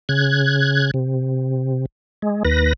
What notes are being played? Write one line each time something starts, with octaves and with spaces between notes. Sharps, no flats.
C#3 F#6 G#6
C3
G#3
D#2 B4 A#6